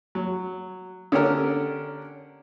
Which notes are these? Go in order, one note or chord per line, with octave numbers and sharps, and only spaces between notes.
F#3
D3 C#4 D4 G4 A#4